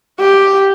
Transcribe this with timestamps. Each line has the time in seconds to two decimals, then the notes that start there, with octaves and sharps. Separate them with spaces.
0.20 G4